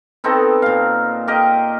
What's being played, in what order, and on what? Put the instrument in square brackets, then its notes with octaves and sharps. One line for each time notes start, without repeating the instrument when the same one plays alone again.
[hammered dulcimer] B3 C4 D#4 A4
A#2 F5
G4 A#4 D#5